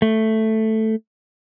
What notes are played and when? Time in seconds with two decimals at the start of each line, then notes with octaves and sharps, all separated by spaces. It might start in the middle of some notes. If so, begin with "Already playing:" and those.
0.02 A3